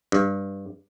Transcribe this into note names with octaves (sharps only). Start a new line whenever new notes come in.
G2